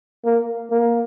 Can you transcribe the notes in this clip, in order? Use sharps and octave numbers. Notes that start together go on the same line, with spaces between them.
A#3
A#3